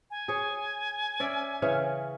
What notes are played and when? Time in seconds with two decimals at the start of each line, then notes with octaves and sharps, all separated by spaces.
0.11 G#5
0.28 G#4 C#5
1.20 C#4 D5 E5
1.62 C#3 E3 C#4